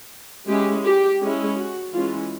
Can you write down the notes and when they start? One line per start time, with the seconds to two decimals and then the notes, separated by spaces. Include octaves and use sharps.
0.48 G#3 C#4 E4 G4
0.85 G4
1.20 G#3 C#4 E4
1.57 F#4
1.94 E3 G#3 C#4 F4